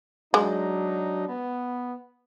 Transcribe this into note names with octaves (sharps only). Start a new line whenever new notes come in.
F#3 G#3 D4 D#4
B3